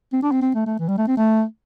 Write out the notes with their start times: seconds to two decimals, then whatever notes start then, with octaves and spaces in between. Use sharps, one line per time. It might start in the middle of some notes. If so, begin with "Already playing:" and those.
0.13 C4
0.23 D4
0.32 C4
0.42 C4
0.54 A3
0.66 A3
0.79 E3
0.89 G3
0.98 A3
1.08 C4
1.17 A3